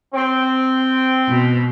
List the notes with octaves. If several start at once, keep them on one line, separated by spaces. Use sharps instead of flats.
C4
B2